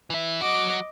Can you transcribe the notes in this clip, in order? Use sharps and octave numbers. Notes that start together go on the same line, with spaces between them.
E3 E4
F#3 F#4 D#5 D6